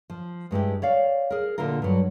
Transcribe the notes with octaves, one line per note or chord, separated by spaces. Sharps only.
F3
G2 G#3 E4 G4
C#5 D5 F5
G#4 A#4
A#2 D3 E4 F4 A#4
G2 F#3